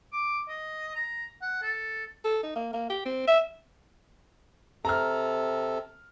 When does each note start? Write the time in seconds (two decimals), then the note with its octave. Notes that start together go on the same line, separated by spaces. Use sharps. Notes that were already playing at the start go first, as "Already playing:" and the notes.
0.13 D6
0.48 D#5
0.95 A#5
1.42 F#5
1.62 A4
2.24 A4
2.43 D#4
2.55 A#3
2.73 A#3
2.90 G4
3.05 C4
3.27 E5
4.85 C3 A4 A#5 F6